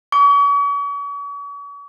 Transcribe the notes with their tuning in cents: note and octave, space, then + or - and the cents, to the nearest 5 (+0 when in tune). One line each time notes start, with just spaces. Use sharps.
C#6 +40